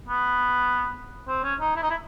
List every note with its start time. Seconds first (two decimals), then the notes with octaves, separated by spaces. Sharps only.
0.08 B3
1.27 C4
1.43 C#4
1.60 D#4
1.76 E4
1.83 D#4
1.90 E4